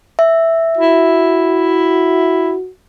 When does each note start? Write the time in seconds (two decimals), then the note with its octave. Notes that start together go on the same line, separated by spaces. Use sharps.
0.19 E5
0.78 E4 F#4